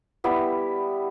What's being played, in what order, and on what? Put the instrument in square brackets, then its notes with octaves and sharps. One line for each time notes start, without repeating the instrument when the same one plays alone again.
[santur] G3 B3 E4 G4